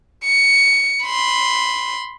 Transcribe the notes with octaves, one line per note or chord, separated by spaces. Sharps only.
C#7
B5 C6